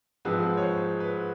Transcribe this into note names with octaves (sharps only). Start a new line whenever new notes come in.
G#2 F3 G#3 C4 B4
C#5
C5
B4